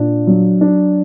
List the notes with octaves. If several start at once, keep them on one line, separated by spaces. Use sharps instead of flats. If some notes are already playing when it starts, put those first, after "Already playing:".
Already playing: A#2 D4
F#3
D4